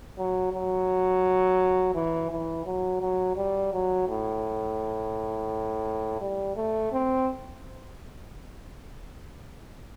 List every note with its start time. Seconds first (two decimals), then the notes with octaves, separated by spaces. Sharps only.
0.18 F#3
0.52 F#3
1.94 E3
2.31 E3
2.66 F#3
3.01 F#3
3.36 G3
3.73 F#3
4.08 A2
6.21 G3
6.56 A3
6.92 C4